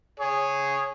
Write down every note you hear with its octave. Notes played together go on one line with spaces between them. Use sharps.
G#4 C#5